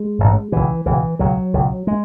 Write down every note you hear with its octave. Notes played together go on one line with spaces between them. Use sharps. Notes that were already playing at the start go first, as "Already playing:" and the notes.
Already playing: G#3
A1 G#2
C#2 B2 E3
C#2 B2 E3
C#2 B2 F#3
C#2 B2
G#3